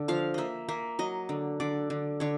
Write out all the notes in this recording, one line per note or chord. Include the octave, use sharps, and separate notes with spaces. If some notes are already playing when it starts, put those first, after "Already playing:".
Already playing: D3
F3 F5
A#3 D#5 E5
A#3 E5
F#3 D#5
D3
D3 D5
D3
D3 C#5